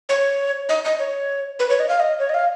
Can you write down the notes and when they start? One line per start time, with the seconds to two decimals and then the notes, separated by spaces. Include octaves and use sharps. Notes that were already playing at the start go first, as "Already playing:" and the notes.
0.09 C#5
0.69 D#5
0.85 D#5
0.99 C#5
1.59 B4
1.69 C#5
1.80 D#5
1.89 F5
2.00 D#5
2.19 C#5
2.29 D#5
2.34 F5